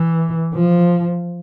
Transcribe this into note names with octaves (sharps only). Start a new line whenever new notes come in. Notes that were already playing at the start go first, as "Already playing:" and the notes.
Already playing: E3
F3